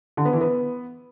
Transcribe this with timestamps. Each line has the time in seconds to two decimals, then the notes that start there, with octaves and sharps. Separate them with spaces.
0.17 D3
0.25 B3
0.33 E3
0.41 B3